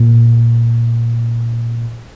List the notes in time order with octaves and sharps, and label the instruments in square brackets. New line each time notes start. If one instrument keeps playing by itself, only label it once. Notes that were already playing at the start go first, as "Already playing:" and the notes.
Already playing: [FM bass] A#2